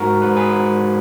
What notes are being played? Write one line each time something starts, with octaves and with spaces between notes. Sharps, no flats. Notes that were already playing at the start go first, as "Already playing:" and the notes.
Already playing: G#2 F#4 A#4
G#2 B4
G#4 B4
G#2